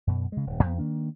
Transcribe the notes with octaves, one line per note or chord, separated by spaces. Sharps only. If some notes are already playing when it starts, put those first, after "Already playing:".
F#2 B2
C#3 G#3
D#1 G2
E2 B3
D#3 A#3 D4